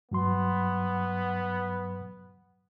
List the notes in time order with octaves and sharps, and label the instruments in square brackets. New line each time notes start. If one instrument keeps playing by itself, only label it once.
[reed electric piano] G2 F#3 C6 [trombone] B3